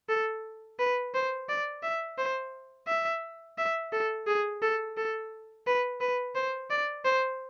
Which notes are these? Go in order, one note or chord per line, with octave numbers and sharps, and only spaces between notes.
A4
B4
C5
D5
E5
C5
E5
E5
A4
G#4
A4
A4
B4
B4
C5
D5
C5